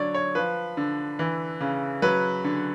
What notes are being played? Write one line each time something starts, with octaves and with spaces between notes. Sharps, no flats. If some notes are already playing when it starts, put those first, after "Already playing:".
Already playing: D3 F#3 C#5 D5
C#5
F3 B4
D3
E3
C#3
F#3 B4
D3